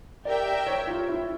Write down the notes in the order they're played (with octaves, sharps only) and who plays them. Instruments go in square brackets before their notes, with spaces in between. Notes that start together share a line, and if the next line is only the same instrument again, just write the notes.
[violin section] G4 A#4 E5 G5 [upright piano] D5
[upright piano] D5
C#5
F4
E4